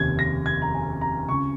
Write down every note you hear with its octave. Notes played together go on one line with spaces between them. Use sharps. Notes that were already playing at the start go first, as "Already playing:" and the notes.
Already playing: F1 D#2 C#3 G#6
A#6
G#6
A#5
G#5
A#5
C#2 C#3 C#6